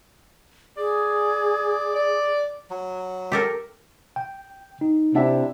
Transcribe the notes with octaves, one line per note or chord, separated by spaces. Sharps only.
G#4 D5
D5
F#3
G4 A4 A#4
G5
D#4
C3 C4 D4 E4 E5